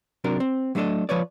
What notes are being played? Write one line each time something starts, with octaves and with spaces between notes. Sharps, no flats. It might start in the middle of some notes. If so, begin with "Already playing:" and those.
C3 F#3 D4 A#4
C4
F#3 A3 D4 F#4 A4 D#5
F3 B4 C#5 D5